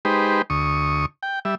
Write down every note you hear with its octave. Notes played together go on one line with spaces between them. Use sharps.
G#3 D#4 G4 B4 C5
D2 C#6 D#6
G5
G3 E5